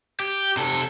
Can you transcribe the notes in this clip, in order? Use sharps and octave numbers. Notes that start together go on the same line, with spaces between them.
G4
C3 A4